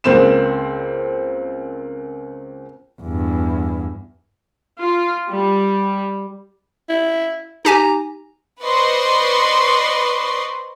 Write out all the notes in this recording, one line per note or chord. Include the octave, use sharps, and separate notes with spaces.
C#2 A#3 C4 C5 E7
E2 G2
F4
G3
E4
D#4 G4 G#5 A#5
B4 C5 D5 D#5 C6 C#6